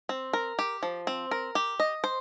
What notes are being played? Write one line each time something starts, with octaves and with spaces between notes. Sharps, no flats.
C4
A#4
G4
F3
C4
A#4
G4
D#5
C5